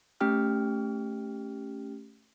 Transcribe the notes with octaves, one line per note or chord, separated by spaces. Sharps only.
A3 C#4 G4 G5 F6